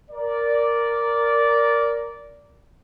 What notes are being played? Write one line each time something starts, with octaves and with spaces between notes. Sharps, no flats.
A#4 D5